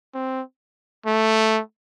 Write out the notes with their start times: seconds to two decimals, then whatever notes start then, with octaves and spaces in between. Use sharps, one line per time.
0.14 C4
1.06 A3